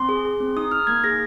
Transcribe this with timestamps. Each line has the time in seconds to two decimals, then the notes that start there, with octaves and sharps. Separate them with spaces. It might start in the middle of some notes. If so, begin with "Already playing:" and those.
Already playing: C4 C6
0.09 G#4
0.25 G#4
0.40 C4
0.57 D#4 D#6
0.71 D#4 F6
0.87 A#3 G#6
1.04 G#4 A#6